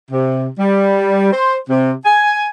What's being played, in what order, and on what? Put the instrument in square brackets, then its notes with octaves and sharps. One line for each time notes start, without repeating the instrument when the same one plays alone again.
[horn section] C3
G3
C5
C3
G#5